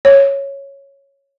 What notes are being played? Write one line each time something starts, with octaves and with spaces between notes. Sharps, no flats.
C#5